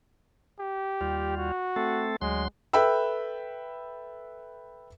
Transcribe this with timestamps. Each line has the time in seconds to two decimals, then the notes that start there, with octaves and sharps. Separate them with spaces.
0.59 G4
1.01 D#2 G3 F4
1.38 F#4
1.76 A3 C4 A4
2.22 D2 F#3 G#3 C6
2.73 A4 B4 E5 G5 B5 E6